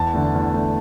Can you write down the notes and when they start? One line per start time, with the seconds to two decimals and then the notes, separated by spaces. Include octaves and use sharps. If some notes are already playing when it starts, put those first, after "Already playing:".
Already playing: E2 A5
0.14 D3 A3
0.34 E2
0.54 D3 A3